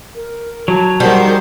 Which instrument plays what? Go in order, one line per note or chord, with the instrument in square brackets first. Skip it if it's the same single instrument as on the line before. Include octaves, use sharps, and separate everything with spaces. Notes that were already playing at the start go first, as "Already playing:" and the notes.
[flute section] A#4
[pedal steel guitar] F#3 [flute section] A5 G#6
[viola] D#3 C5 [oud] G3 [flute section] G#4 F#5